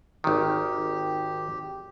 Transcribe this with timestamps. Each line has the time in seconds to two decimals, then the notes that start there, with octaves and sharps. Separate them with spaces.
0.24 G#1 D#3 G4